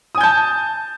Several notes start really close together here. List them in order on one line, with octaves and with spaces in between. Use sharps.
D#6 G#5 G6 A5